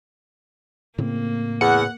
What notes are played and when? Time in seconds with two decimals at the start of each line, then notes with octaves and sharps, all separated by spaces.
0.98 A2 C#3 A#3 C4
1.61 E2 F#5